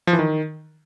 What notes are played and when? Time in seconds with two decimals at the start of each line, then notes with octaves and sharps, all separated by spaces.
0.07 F3
0.13 E3
0.19 D#3